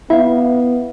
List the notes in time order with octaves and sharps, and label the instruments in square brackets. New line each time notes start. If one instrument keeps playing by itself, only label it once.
[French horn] B3 [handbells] E4 [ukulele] E5 F5